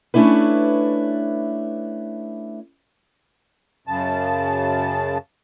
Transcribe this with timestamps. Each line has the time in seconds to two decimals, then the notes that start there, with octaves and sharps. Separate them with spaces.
0.14 A3 C#4 D4 E4 B4
3.87 F#2 C#3 A5